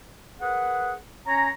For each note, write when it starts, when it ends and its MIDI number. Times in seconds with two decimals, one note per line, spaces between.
0.40 0.94 68
0.40 0.94 70
0.40 0.94 71
0.40 0.94 78
1.26 1.49 61
1.26 1.49 73
1.26 1.49 82